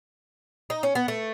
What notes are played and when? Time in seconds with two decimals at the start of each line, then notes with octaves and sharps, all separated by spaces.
0.70 D#4
0.83 C#4
0.95 B3
1.08 A3